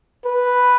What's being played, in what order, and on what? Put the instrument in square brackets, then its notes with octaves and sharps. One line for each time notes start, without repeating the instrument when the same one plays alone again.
[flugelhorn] B4